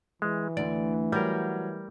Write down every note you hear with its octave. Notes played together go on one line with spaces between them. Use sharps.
E3 G#3
D2 D5
F#3 G3 A#4